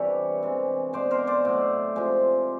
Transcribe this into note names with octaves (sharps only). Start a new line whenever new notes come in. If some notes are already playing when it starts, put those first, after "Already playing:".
Already playing: G2 C3 E3 G3 G4 A4 B4 C#5
C3 E3 G#3
B2 G#3 C5 D5
A#4 C5
C5 D5
A2 F#3
C3 F3 G#3